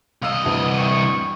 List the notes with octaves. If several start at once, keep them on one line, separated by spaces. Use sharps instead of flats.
C2 D#5 F5 E6
D2 G2 E3
E4 G5 C#6